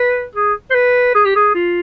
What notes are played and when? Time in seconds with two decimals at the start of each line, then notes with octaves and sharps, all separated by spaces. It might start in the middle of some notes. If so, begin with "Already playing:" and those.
Already playing: B4
0.35 G#4
0.71 C5
0.75 B4
1.15 G#4
1.25 G4
1.36 G#4
1.55 F4